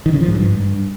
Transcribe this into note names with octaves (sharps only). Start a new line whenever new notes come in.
D#3
C#3
F3
G#2
G2